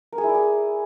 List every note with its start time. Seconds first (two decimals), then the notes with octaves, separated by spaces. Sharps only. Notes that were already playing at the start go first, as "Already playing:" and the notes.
0.12 A#4
0.18 G#4
0.24 E4
0.29 D5
0.35 G#4